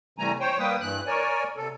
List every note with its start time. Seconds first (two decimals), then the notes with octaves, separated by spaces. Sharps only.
0.18 C3 E3 G3 A3 G#5 A#5
0.40 C5 C#5 G5
0.59 G3 A#3 B4 G5 D#6
0.81 G2 E3 F#6
1.07 A#4 C#5 D5 G#5
1.57 C3 A4